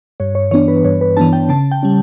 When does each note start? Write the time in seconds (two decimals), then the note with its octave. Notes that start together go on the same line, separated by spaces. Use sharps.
0.20 G2 C#5
0.35 C#5
0.51 E3 B3 D4 C#5
0.68 B4
0.84 G2 C#5
1.01 B4
1.17 E3 B3 D4 A5
1.33 G5
1.49 C#3 A5
1.71 G5
1.83 G3 C#4